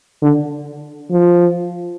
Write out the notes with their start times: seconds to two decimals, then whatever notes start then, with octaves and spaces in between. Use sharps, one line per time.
0.22 D3
1.11 F3